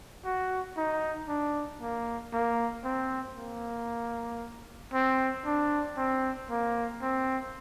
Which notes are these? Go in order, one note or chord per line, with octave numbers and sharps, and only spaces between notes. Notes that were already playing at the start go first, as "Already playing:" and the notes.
F#4
D#4
D4
A#3
A#3
C4
A#3
C4
D4
C4
A#3
C4